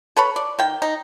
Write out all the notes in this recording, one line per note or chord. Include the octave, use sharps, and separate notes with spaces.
A4 B4 C#5 B5
D5
D#3 G5
D#4